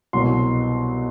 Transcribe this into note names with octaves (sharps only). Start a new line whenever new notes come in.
C2 B2 F#3 C6